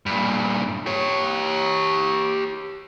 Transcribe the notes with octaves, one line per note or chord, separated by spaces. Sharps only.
G2 A#2
G4 C#5